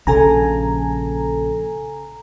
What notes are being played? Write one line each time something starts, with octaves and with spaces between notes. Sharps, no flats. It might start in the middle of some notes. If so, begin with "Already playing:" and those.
A#1 C#3 A4 G#5 A#5